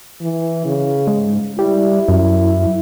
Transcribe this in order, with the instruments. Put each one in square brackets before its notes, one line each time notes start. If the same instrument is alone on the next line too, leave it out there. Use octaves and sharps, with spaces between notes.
[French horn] E3
C#3
[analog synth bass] G#2
[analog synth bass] G3 [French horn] E4
[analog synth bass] F#2